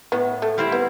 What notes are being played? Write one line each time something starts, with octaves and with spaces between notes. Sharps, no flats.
A2 B3
A3
G3 C4 E4
B3